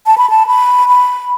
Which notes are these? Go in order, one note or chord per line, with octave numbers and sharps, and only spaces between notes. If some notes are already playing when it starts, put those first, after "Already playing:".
A5
B5
A5
B5
B5